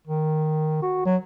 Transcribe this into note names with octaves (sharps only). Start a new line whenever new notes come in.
D#3
F#4
F#3